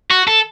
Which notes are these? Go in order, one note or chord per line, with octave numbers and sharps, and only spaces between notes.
F#4
A4